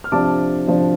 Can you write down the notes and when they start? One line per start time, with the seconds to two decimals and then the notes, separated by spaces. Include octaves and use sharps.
0.04 F6
0.12 C3 F3 D4 A5 D6
0.67 C3 F3 D4